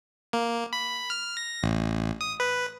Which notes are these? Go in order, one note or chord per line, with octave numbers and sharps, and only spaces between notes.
A#3
B5
F6
A#6
A1
D#6
B4